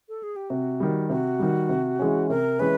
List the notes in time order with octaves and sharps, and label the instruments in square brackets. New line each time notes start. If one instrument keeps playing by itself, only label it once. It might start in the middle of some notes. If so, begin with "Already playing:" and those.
[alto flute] A4
G#4
G4
[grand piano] C3 [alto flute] F#4
[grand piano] D#3 G3
[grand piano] C3 [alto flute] F#4
[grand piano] D#3 G3
C3
E3 G#3 C#4
[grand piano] C3 [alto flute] A#4
[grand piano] E3 G#3 C#4 [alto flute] B4